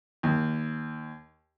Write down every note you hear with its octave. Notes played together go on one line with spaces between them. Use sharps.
D#2